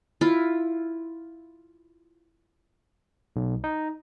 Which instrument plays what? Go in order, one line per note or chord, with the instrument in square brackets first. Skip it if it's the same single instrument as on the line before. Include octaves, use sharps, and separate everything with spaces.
[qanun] E4 F4
[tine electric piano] B1
D#4